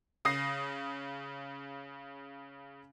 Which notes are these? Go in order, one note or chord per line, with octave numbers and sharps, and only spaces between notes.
C#3 D#6 A#6 C7